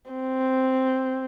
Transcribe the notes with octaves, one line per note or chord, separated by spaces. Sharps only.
C4